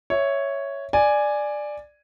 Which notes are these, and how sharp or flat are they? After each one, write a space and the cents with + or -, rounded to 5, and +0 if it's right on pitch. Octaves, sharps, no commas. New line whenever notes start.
C#5 +0 E5 +0
D5 +10 G#5 +0